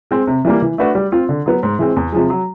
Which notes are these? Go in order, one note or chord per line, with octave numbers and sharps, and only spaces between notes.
G#3 C4
C3
E3 G3 A#3
E3
A3 D4 F#4 B4
G3
C4 F4
D3
F#3 B3
G#2
E3 G#3 C4
E2
C3 F3 G#3
F#3